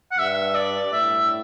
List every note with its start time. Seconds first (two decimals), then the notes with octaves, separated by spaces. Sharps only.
0.11 F#5
0.17 G2 E5
0.55 D5
0.92 A2 E5